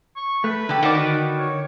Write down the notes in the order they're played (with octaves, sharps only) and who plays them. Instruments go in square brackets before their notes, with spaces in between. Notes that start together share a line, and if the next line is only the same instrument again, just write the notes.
[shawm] C#6
[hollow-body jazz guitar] A3 [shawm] B4
[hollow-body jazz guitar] D3 [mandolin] G4 A4
[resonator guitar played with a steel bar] D#3 [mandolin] F#4 D5
[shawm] C#5